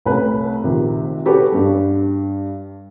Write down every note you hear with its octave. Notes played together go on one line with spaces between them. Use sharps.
C2 A3 C#4 B4
A#1 C3 D#3
C#4 F#4 G4 A4 B4
G2 G3